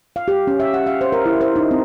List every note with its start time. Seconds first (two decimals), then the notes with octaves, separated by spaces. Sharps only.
0.16 F5
0.28 G4
0.47 C#4
0.60 E5
0.74 F#5
0.86 F5
1.01 C5
1.12 A#4
1.26 E4
1.41 C5
1.56 D#4
1.71 C4